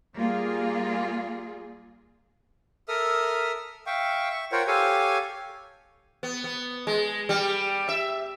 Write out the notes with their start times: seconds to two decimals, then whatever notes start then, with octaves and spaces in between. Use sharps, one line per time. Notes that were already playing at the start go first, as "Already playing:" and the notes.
0.17 G3 A#3 F4 G#4
2.88 A4 A#4 E5 D#6 F6
3.86 E5 F5 G5 C#6
4.30 E5 C#6
4.52 F4 A#4 C5 C#5 F#5 G5
4.68 G4 A4 C#5 F5 G#5
6.23 B3
6.44 B3
6.87 G#3
7.29 G3
7.89 E5